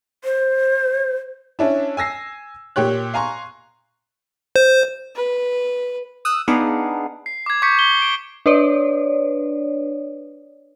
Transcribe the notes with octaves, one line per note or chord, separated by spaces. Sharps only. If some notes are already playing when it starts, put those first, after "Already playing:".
C5
C#4 D4 E4
G#5 E6 A#6 C7
A#2 G4 C#5 F#6
F5 G#5 A#5 C6 C#6
C5
B4
D#6 E6 F#6
B3 D4 D#4 G#4 F5 F#5
C7
D6 G#6
C#6 D6 G6 G#6 B6 C#7
G7
D7
D4 B4 C#5 D5